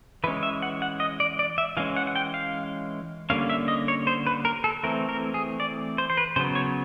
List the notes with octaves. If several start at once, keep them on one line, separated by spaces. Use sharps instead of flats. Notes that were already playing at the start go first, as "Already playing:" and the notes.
E3 G#3 C#4 B4
E5
F#5
F#5
D#5
D5
D5
E5
E3 G#3 C#4 F5
F#5
F#5
G5
F5
D3 G3 A#3 C#4 F5
E5
D#5
C#5
C5
B4
A#4
A4
E3 A3 C4 A#4
A#4
G#4
D5
C5
C5
B4
C#3 F#3 B3 C5
C#5